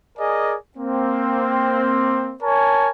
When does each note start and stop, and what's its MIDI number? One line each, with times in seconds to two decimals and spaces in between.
0.18 0.56 68
0.18 0.56 70
0.18 0.56 74
0.18 0.56 75
0.18 0.56 80
0.78 2.36 58
0.78 2.36 60
2.43 2.90 70
2.43 2.90 73
2.43 2.90 80
2.43 2.90 81